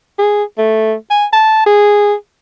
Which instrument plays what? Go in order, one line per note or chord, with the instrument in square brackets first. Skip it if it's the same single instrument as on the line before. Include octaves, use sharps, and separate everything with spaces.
[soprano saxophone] G#4
A3
G#5
A5
G#4